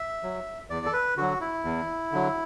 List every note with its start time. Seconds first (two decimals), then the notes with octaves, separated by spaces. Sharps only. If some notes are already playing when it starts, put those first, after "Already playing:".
Already playing: E5
0.23 F#3
0.70 E2 D5
0.86 A4
0.93 B4
1.17 D3 F#3 F#4
1.41 E4
1.65 E2
2.12 D3 F#3